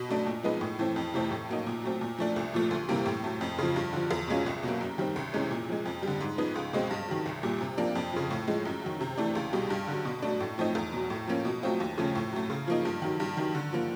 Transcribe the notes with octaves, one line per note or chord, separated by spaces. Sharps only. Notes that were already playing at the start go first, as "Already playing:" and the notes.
Already playing: B2
F#3 A3 D4
A#2
F3 G#3 B3 D#4
A2
E3 A3 C4
F2
C3 E3 A3 C4
A2
F#3 A#3 D#4
A#2
F#3 A3 C4
A#2
F3 A3 D4
C2
A#2 F3 A3
D2
C3 E3 G3 A#3
A2
F#3 A3
F2
C#3 F3
G2
D3 F3
E2
B2 G#3 C#4 F4
C2
B2 F#3 A#3
F#2
D#3 G3 C4
C2
C3 E3 G#3 C#4
A#2
F3 G#3
F2
D3 G3
G#2
F3 G#3 B3 D#4
C#2
B2 G#3 C4
G2
D#3 F#3
C2
A#2 G3
C3
F3 A#3 D4
F2
C#3 F3
A2
F3 G#3
F#2
D#3 F#3
C3
E3 A3 D4
C#2
B2 G3
G2
D3 F#3
B2
F#3 A3 D4
A2
F3 A3 C4 D#4
E2
B2 F#3
A2
F3 A#3 C#4
B2
F#3 A3 C4 F4
D#2
C#3 F3 A3 C#4
A2
F#3 A3
C#3
F3 A#3 D#4
G2
D#3 F#3
G2
D#3 F#3
D3
F3 A#3